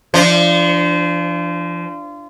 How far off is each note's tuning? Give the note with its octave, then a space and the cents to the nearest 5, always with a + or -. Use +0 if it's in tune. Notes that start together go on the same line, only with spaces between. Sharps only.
F3 -30 D4 +0